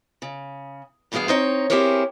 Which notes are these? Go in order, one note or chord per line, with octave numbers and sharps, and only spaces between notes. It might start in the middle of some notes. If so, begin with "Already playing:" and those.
C#3
G2 B2 E3 B3 G#4 F5
C4 D#4 C#5
C4 E4 G4 G#4 A#4 C#5